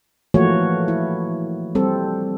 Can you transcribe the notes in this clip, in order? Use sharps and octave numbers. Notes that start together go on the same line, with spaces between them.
E3 F3 A3 A#3 F#4 C#5
E4
G3 C4 A4